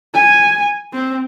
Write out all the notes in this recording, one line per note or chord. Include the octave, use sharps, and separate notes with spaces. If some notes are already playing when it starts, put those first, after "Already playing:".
G#5
C4